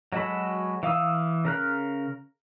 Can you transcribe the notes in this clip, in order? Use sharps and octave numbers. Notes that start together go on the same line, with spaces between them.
F#3 G#3 F#4 A4 B5
E3 F5 D#6 E6
C#3 A#4 F#6